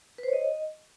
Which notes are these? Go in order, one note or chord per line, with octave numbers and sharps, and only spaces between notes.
B4
C5
C#5
D#5